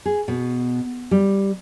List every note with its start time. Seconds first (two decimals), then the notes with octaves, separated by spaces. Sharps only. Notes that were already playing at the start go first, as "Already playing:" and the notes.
0.06 G#4
0.28 B2
1.11 G3